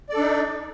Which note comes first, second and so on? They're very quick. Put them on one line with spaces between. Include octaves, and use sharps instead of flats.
D5 A4 D4 D#4